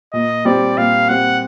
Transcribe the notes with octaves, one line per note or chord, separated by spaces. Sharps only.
A#2 D#5
G3 C4 D5
A#2 F5
G3 C4 F#5